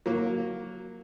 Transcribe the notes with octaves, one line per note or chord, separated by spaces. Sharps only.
F#3 A#3